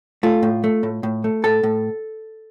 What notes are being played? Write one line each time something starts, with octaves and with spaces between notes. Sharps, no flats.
A3 F4
A2
A3
A2
A2
A3
A2 A4
A2